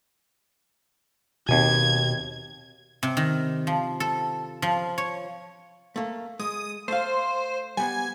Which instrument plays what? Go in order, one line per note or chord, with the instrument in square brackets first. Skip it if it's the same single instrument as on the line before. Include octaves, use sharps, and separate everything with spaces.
[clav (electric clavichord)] D#2 G#5 [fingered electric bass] B2 C4 [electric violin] G#6
[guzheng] C3
D#3
F3
A4
F3
C#5
[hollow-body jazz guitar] A3 A#3
[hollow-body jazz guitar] G#3 [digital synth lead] D#6
[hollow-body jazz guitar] A3 F5 [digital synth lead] C5
[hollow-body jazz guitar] G3 B3 [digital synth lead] G#5